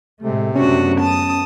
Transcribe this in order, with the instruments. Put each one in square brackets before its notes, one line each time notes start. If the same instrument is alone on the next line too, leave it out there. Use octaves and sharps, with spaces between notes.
[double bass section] A2 G#3 A3 [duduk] C3
[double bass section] F#2 C#3 B3 [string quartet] A3 D4 F#4 [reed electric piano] C#4
[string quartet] A5 D#6